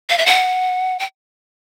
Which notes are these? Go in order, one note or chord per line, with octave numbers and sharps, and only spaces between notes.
F5
E5
F#5
G5